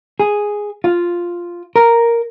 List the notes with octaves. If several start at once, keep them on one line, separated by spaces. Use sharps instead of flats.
G#4
F4
A#4